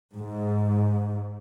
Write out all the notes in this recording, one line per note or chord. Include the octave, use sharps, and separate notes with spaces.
G#2